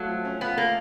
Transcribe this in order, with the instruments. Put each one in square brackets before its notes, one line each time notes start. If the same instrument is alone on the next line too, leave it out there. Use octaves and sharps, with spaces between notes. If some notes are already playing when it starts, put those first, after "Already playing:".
Already playing: [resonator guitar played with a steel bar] F#3 [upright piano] A3 F4
[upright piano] F3
C#4
[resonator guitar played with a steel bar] B3 [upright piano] F4
[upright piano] A3 [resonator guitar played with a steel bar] A#3